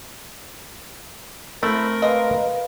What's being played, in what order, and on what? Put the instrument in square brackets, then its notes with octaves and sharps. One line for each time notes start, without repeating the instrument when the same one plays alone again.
[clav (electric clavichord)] A3 C4 [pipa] E4 [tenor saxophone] A#4
[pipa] G#3 D#5 [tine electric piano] B4 F5